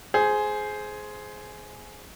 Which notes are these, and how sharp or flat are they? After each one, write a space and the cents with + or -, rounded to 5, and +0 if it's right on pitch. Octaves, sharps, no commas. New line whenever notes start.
G#4 +15 C5 +0